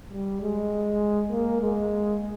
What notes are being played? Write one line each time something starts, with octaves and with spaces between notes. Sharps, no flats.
G3
G#3
A#3
G#3